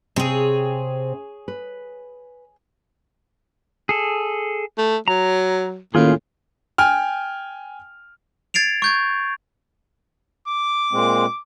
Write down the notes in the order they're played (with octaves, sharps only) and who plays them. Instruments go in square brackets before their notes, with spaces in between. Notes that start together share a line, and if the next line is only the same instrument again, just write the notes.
[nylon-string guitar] C3 C4 G5 [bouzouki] G#4 C#5
[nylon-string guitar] B4
[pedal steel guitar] G#4 A4
[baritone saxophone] A3
[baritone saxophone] F#3 [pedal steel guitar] A#5
[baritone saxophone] A2 [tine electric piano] D#3 A#3 C#4 [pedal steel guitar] F4 G#4
[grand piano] G5 G#5 F6
[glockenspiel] G#6 A6 C7 D7 F7
C#6 G6 G#6
[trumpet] D6
[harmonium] A#2 G#3 C4